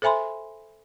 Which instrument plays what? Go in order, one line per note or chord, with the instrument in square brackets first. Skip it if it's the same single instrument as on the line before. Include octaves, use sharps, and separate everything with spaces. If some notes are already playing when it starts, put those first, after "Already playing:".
[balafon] A4 C5 E5 G#5 B5 C6